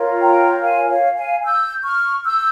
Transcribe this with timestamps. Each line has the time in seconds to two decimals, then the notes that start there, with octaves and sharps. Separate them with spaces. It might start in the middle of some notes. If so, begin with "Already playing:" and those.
Already playing: F4 A#4 C#5
0.21 G5 A#5
0.62 F5 G#5
0.89 C#5 F5
1.16 F5 G#5
1.44 E6 G6
1.84 C#6 F6
2.24 E6 G6